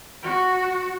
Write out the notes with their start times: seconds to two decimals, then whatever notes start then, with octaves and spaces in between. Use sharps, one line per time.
0.23 F#4